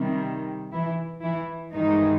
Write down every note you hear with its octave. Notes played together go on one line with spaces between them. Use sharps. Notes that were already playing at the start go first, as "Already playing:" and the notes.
Already playing: C3 D#3 G3
E3 E4
E3 E4
G2 D#3 E3 G#3 D#4